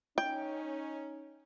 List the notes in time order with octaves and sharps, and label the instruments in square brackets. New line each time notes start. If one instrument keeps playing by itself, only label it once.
[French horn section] C#4 D#4 [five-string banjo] G5